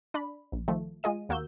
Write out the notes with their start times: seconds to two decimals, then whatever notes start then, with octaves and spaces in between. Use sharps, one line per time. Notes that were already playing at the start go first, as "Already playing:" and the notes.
0.14 D4 D5 B5
0.52 A#1
0.68 D#3 F3 A3
1.03 G#3 F4 G#4 D#5 D#7
1.29 D#2 A#3 F#4 E6 G6